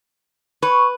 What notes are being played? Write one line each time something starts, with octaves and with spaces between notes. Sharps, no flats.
B4 C#5 C#6